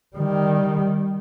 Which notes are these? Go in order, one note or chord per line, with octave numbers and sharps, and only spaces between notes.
D#3 G3